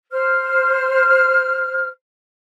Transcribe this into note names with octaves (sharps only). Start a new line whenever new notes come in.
C5 F6